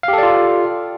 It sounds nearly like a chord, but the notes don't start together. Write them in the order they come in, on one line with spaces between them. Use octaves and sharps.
F5 G4 A4 D5 F4